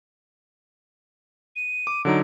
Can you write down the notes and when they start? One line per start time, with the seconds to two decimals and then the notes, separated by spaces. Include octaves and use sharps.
1.56 D#7
1.87 D6
2.05 D3 F#3 D#4 D7